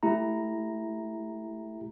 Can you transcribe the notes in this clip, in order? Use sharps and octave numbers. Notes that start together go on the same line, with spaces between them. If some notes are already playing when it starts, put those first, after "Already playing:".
A3 E4 G4 A#5